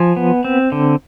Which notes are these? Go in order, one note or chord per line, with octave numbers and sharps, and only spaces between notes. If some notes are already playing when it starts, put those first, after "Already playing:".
Already playing: F3 G#5
B3
C4
D3